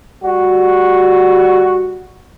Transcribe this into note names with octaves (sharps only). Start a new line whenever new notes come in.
G3 F#4